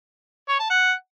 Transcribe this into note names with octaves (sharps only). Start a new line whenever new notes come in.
C#5
A5
F#5